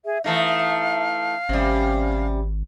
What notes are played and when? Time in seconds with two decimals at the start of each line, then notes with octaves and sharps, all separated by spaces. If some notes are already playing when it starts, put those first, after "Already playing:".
0.05 G#4 E5
0.24 E3 A3 D#4 E5 F5
1.49 G#1 C3 G3 C#4